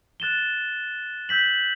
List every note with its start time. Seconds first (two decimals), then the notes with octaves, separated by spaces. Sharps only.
0.20 F#6 A6 E7 G7
1.29 E6 G6 B6 F#7